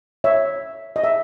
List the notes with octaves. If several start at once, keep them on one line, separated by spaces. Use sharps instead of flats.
C#5 E5
D#5
E5